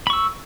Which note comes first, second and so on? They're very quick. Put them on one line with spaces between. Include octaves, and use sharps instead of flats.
B5 C#6 E6